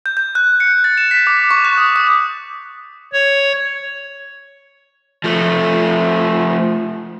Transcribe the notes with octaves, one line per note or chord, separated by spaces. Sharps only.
G6
G6
F#6
C#7
A6
E7
B6
D6
C#6
F#6
D#6
D#6
C#5
F3 A3